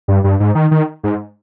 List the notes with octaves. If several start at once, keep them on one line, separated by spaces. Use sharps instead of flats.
G2
G2
G#2
D#3
D#3
G#2